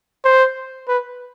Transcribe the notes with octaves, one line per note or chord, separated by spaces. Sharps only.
C5
B4